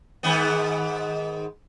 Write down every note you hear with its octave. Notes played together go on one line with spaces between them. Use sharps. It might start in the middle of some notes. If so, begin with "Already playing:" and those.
G#2 D#3 B3